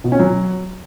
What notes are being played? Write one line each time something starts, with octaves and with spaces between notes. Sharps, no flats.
B2
C#4
F#3